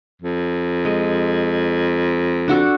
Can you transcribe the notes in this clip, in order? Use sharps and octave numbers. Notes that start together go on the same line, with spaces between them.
F2
G#3
D4 F#4 A4